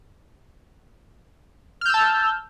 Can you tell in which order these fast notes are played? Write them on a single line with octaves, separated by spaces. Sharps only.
F6 G6 E6 A5